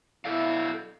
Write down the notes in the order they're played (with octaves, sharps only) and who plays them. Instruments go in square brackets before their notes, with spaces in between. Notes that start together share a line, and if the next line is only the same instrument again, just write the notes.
[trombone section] B2 E4 [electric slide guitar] A4 D5 F5